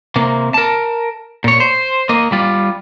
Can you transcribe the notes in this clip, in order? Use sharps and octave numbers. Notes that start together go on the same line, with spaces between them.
C3 A#3
A#4 A5
A#2 C#5
C5
A#3 D#5
G3 F4